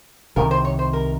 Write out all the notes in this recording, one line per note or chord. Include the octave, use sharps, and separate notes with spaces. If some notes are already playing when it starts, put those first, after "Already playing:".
C2 C3 D#3 A#4
C5
C#5
C5
A#4